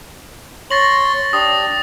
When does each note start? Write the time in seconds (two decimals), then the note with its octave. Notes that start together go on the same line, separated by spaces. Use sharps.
0.71 C#5 C6 A6 A#6 F#7
1.33 D4 G4 D#6